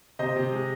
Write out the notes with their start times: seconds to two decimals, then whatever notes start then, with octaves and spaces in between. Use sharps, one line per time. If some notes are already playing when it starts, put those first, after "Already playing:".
0.19 C3 C5 D#5
0.36 C3
0.52 G#3